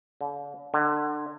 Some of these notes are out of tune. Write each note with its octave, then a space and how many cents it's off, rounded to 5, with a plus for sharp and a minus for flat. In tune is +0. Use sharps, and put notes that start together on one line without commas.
D3 -45
D3 +25